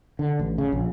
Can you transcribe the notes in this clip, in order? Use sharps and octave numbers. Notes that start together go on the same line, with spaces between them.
D3
A1
C#3
A#1